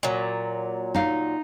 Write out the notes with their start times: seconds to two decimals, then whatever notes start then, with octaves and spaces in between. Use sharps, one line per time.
0.03 A#2 F#3
0.95 D#4 F5